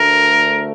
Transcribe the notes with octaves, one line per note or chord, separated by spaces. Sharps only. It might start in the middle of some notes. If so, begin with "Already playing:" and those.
Already playing: D2 D3 A3 A#4